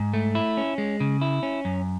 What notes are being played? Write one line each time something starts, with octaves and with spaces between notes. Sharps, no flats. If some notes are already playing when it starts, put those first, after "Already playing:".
Already playing: G#2
A3
E4
C#4
G#3
C#3
E4
C#4
F#2